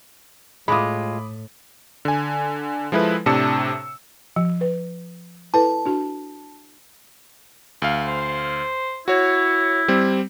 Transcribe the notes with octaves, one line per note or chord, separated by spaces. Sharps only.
A2 G#3 F4 B5 D6 D#6
D3 G#5
F3 G#3 E4 A4 B4
A2 C3 D4 A5 E6 C#7
F3
B4
E4 A4 B4 A5
D4 F#4
D2 F5
C5
E4 F#4 C#5
G3 C4